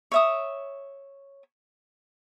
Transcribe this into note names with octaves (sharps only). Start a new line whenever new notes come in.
C#5 E5 D#6